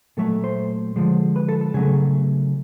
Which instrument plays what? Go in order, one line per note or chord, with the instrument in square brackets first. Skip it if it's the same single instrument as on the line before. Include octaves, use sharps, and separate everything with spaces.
[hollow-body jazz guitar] A#2 F#3 A3 A4
C5
D3 F3 G#3
B4
A4
A4
C#3 F#3 A3 G#4